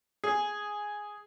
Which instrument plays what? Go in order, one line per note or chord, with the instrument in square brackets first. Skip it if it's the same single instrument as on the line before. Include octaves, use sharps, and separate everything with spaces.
[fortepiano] G#4